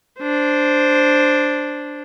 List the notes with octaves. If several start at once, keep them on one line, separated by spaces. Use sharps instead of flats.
D4 C5